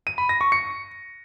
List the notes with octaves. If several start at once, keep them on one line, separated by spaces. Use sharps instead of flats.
D#7
B5
A#6
C#6
C#7